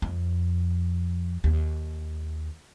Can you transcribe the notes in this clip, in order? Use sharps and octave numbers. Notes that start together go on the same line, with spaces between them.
F2
D#2